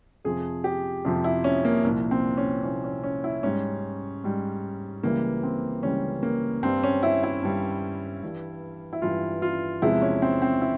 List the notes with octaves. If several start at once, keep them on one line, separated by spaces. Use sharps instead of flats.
F2 C3 F3 G#4
G4
F2 C3 F3
E4
C#4
A#3
C2 A#2 F3
C4
C#4
C2 A#2 F3 C#4
C#4
C#4
E4
G#2 G3 C#4
G#2 G3
C#2 C#3 E3 G3 A#3
C4
C#2 C#3 E3 G3 C#4
A#3
G2 G3 C4
C#4
E4
E4
G2 G3
G2 E3 G3
E4
G2 E3 G3 F4
F4
E2 C3 F3 G#3 E4
C#4
C4
C4
E4